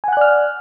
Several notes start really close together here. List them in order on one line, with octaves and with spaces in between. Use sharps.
G#5 F#5 F#6 D5 F6